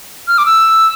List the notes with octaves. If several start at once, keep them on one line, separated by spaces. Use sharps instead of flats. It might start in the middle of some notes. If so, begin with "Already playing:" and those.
F6
D6
E6